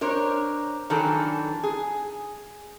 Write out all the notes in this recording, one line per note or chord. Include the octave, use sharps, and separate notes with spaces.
D4 A#4 C5 C#5
D#3 E3 F#3 D4 G#4 A4
G#4